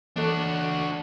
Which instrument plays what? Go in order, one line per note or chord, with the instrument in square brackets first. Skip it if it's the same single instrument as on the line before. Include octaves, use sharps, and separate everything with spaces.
[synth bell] E3 A4 [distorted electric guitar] D4 F#4